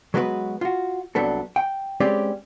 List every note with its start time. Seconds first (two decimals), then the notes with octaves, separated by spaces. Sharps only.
0.14 F#3 G#3 B3 F#4 A#4 B4
0.61 F4 F#4
1.15 C2 C3 F#3 B3 D4 A4
1.56 G5
2.00 G#3 C4 C#4 G4 B4 D5